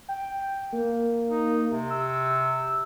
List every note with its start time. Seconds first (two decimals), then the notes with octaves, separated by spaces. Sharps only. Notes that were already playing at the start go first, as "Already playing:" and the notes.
0.09 G5
0.73 A#3
1.29 D#4
1.68 C3
1.90 E6